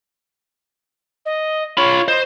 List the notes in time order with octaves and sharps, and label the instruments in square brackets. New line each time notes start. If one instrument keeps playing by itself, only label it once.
[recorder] D#5
[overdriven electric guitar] F4 B5 [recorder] C#5
[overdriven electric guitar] C5 [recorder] D#5